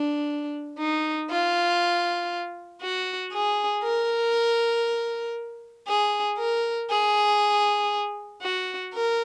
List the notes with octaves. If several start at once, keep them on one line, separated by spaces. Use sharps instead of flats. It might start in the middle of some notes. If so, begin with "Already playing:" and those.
Already playing: D4
D#4
F4
F#4
G#4
A#4
G#4
A#4
G#4
F#4
A#4